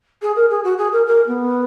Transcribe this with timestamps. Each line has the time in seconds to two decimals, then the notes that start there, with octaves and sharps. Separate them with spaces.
0.22 G#4
0.36 A#4
0.50 G#4
0.64 F#4
0.78 G#4
0.92 A#4
1.06 A#4
1.27 B3